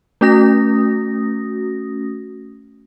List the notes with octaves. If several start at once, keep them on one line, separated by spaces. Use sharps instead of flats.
A3 C#4 F#4 D#6 A#6